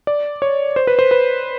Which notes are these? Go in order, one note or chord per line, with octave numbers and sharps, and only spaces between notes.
D5
C#5
C5
B4
C5
B4